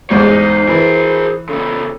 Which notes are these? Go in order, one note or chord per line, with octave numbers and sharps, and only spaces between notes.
A1 E2 G#2 G#4 C5 C#5
D#4
E3 G#4 A#4
C#3 B3 A4